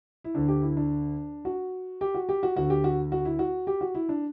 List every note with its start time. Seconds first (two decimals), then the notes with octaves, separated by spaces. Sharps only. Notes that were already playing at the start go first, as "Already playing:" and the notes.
0.24 E4
0.35 D2 D3 D4
0.48 G4
0.62 E4
0.77 D4
1.45 F#4
2.01 G4
2.15 F#4
2.29 G4
2.43 F#4
2.56 D2 D3 F#4
2.70 G4
2.84 F#4
3.12 F#4
3.25 E4
3.39 F#4
3.67 G4
3.81 F#4
3.95 E4
4.09 D4